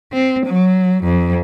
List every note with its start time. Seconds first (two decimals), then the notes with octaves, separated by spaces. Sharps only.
0.13 C4
0.47 F#3
1.04 F2